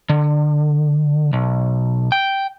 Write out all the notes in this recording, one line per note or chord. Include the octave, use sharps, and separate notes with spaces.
D3
B1
G5